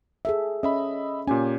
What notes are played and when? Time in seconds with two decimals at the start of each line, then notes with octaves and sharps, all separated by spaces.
0.25 G#4 A4 E5
0.63 C#4 D#5 E5 B5
1.27 A#2 C#4 G4 G#5